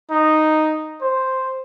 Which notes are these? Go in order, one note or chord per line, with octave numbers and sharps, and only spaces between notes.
D#4
C5